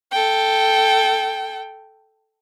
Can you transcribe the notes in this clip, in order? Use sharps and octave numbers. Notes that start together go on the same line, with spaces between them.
A4 G5